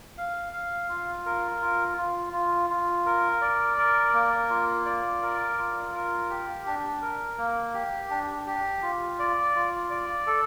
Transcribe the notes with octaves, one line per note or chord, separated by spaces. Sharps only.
F5
F5
F4
A#4
F4
F4
F4
F4
A#4
D5
A#4
A#3
F4
D5
A#4
F4
A#4
G4
D4
A#4
A#3
G4
D4
G4
F4
D5
F4
D5
A4